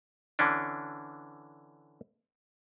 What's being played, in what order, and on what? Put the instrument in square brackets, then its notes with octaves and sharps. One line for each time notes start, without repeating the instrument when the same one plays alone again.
[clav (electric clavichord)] D3 E3 C#4 D4